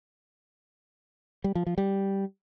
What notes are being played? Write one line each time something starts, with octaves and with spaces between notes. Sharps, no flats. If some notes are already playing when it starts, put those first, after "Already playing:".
G3
F3
F3
G3